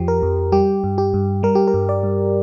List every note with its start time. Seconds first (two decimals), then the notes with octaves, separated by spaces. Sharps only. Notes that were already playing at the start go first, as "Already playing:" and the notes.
Already playing: F2 F3 G4
0.08 A#4
0.23 F2
0.52 G3 G4
0.84 G2
0.98 G4
1.14 G2
1.43 G3 A#4
1.55 G4
1.67 A#4
1.74 G2
1.89 D5
2.03 G2